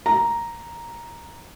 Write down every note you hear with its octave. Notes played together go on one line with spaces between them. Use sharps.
A#5